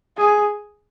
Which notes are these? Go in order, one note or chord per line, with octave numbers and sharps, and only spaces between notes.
G#4